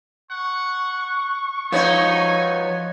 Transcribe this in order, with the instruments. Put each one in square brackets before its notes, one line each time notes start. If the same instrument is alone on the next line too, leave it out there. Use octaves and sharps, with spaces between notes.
[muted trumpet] F#5 [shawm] C#6
[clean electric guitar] F3 C#5 [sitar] B3 D#4 [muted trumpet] G#5